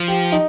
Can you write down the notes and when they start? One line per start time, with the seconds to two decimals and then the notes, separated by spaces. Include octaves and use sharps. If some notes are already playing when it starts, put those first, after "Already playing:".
Already playing: F3
0.08 G4
0.32 D#4